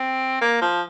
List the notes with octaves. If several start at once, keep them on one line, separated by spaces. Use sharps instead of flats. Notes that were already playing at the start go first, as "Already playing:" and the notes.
Already playing: C4
A#3
F3